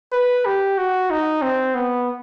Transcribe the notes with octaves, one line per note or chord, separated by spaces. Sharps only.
B4
G4
F#4
D#4
C4
B3